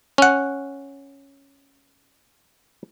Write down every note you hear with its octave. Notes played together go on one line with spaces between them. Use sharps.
C#4 F#5